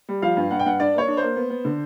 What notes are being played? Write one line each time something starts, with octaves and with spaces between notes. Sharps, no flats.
G3
F3 F5
G2
G2 F#5
G5
G2 F#5
D4 D5
A#3 C#5
D4
A#3 C5
B3
B3
D3